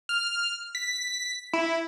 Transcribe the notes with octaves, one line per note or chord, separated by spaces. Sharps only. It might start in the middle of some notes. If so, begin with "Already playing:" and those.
F6
B6
E4